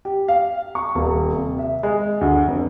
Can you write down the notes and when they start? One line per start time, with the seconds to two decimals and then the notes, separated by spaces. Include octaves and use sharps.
0.05 G4
0.28 F5
0.75 C#6
0.95 D#1
1.33 C3
1.59 E5
1.83 G#3
2.21 D2
2.48 F1